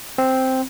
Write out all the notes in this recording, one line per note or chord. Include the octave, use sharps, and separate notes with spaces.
C4